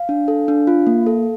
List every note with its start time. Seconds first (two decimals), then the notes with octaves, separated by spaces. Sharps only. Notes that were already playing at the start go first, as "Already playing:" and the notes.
Already playing: F5
0.09 D4
0.28 A4
0.48 D4
0.67 F4
0.87 A#3
1.06 A4